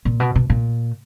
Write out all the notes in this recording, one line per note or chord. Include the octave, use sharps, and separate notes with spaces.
A#2
B2
B2
A#2